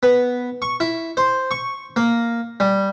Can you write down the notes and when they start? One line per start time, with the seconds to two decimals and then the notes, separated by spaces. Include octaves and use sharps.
0.03 B3
0.62 C#6
0.80 E4
1.17 C5
1.51 C#6
1.96 A#3
2.60 G3